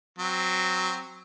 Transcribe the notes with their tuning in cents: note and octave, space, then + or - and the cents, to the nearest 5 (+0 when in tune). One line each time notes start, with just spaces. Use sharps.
F#3 +0 C4 +0